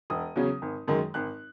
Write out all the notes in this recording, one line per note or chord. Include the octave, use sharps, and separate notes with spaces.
E1 D#6
E2 C#3 F#3 C#4
G#1
F#2 D#3 G#3
G#1 F#6